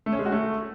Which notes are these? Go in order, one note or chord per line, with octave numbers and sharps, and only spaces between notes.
A3
C#4
G#3
F#4
A3